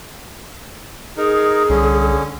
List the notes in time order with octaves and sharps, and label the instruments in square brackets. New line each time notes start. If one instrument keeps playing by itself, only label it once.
[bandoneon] D#4 A#4 [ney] G#4
[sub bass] C2 [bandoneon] D3 C#4